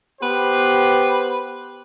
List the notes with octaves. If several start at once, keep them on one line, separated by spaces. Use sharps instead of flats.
B3 G4 B4 C5